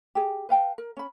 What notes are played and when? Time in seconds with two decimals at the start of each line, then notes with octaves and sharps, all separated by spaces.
0.15 G4 G#4
0.49 B4 F5 G5 A5
0.78 A#4
0.97 C#4 B5